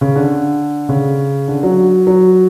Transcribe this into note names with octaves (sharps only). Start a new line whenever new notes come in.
C#3
D3
C#3
D3
F#3
F#3